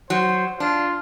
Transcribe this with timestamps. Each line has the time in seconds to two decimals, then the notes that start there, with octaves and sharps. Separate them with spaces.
0.10 F#3 C5
0.60 D4 F4